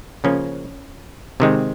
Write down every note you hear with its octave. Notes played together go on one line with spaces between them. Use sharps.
C#3 F3 A#3 C#4
C3 D#3 G#3 C4